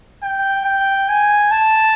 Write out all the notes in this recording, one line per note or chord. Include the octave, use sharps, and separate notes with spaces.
G5
G5
G#5
A5